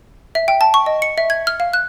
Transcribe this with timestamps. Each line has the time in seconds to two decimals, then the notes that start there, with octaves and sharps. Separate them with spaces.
0.35 E5
0.48 G5
0.61 A5
0.74 C#6
0.86 D#5
1.02 C#7
1.18 E5
1.30 G#6
1.47 F6
1.60 F5
1.73 F#6